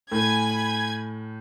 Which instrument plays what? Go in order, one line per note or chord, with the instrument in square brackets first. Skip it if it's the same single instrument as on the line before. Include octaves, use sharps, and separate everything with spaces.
[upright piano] A2 [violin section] G#5 B5 G#6